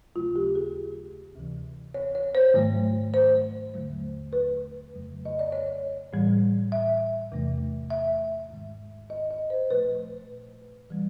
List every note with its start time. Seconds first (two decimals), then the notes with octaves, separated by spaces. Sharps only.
0.15 D#2 C#3 F#3 A3 F4
0.36 G4
0.55 G#4
1.35 D2 C3 E3
1.94 C#5
2.15 C#5
2.35 C5
2.54 G#2 D#3 F#3 A3
3.14 C5
3.74 D#2 D3 F#3 A3
4.33 B4
4.93 F2 C#3 F#3 A3
5.25 D#5
5.39 D5
5.52 C#5
6.13 A2 E3 G3
6.72 E5
7.32 E2 C3 E3 A3
7.90 E5
8.50 G#2 D#3 G#3
9.10 D#5
9.31 D#5
9.50 C5
9.71 A#2 F3 A3 B4
10.90 E3 G3